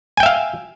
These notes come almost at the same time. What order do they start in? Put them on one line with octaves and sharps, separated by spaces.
G#5 G5 E5 F5